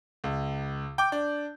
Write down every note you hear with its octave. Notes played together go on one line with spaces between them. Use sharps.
C#2
G5 D6 G6
D4